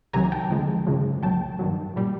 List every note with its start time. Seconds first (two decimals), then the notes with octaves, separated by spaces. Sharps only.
0.13 C2 C3 D#3 F#3 G#5 A#5
0.32 G5 A5
0.49 D#2 D3 F3 G#3
0.87 G#1 F#2 C#3 F3 G#3
1.23 C2 A#2 F#3 G5 A5
1.59 G2 D#3 F#3
1.96 A#2 G3